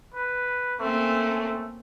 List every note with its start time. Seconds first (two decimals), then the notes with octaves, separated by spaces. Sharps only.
0.14 B4
0.80 A3 A#3 C4 C#4